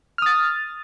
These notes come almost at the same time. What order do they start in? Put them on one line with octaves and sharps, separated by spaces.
F6 D#6 A6